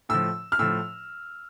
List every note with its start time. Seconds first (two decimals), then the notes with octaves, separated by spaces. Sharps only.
0.09 A2 F3 E6
0.52 F6
0.59 A2 F3 E6